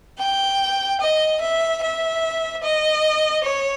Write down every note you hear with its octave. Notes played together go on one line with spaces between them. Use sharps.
G5
D#5
E5
E5
D#5
C#5